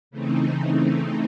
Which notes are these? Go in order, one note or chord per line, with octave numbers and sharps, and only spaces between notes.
C#3 E3 A3 C4 D#4